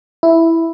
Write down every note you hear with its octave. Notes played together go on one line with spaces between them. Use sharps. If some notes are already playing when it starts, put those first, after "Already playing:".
E4